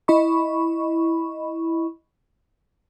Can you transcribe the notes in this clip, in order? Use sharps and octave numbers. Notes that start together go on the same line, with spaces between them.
E4 D#5 B5 C#6